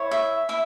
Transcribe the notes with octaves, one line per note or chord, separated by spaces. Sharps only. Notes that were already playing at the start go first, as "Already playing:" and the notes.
Already playing: E4 C#5
E5
E4 E5